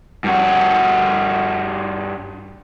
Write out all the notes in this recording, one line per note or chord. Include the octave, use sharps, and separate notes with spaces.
G2 F#4